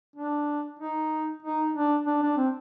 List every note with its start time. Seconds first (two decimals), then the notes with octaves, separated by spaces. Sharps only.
0.16 D4
0.80 D#4
1.43 D#4
1.74 D4
2.07 D4
2.22 D4
2.37 C4